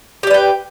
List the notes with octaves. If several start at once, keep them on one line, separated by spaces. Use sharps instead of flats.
G4 B4 D5 G5